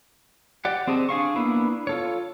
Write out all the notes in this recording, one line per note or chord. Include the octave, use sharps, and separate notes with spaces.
G4 D5 F#5
C4 G4 G#4 D#5 A5
D4 G#4 F5 C#6
A#3 B3 D4 E4
F4 A4 C#5